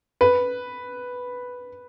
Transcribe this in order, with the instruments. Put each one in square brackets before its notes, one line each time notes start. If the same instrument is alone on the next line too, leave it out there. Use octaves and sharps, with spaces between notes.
[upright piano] B4